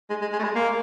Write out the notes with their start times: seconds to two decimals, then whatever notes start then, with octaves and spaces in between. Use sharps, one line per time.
0.10 G#3
0.21 G#3
0.32 G#3
0.39 A3
0.44 G#3
0.55 A#3